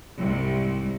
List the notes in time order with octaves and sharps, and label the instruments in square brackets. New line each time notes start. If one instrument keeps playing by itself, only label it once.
[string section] C2 G#2